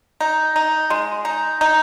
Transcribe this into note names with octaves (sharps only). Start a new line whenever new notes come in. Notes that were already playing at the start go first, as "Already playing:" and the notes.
D#4
D#4
G#3
D#4
D#4